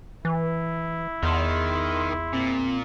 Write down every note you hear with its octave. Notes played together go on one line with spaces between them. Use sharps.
E3 E4
E2 D#3 C6
A#2 C4